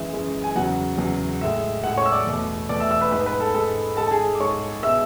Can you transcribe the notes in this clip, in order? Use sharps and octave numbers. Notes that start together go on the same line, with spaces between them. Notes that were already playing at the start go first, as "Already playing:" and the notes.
Already playing: F#2 E3 G#3 E5
F#2 E3 G#3
G#5
E2 C#3 F#3 F#5
E2 C#3 F#3
A2 G#3 E5
A2 G#3 F#5
C#5 C#6
E6
D5 D6
E2 B2 A3
E2 B2 A3 D5 D6
E5 E6
E5 E6
B4 B5
G#2 G#3 B4 B5
B4 B5
A4 A5
G#2 G#3 A4 A5
G#2 G#3 A4 A5
A5
G#4 G#5
D6
G#2 G#3 C#5 C#6
B2 G#3 E5 E6